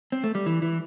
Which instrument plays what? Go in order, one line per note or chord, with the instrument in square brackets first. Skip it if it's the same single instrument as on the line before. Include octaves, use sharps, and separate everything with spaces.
[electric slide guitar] C4
A3
G3
E3
E3